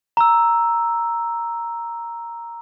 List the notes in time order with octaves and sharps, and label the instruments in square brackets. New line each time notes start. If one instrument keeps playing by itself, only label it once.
[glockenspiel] A#5 E6